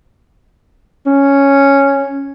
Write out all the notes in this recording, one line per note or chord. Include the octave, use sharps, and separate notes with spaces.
C#4